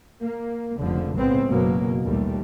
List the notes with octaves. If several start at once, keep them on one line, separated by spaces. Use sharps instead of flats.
A#3
F1 C#2 D3 F3
B1 A2 C#3 G#3 B3 C4
F#1 B2 F#3 A#3
A#1 D#2 G3 A3